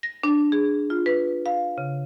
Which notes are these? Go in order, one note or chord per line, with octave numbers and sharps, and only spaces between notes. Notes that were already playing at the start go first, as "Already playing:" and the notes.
A#6
D4
G#4
F4
B4
F5
C#3